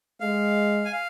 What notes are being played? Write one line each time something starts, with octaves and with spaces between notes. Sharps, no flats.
G#3 F5
G#5
F5